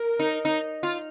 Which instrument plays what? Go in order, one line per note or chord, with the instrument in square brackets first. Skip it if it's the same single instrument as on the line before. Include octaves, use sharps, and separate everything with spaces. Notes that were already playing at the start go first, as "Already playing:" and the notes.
Already playing: [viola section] A#4
[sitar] D#4
D#4
F4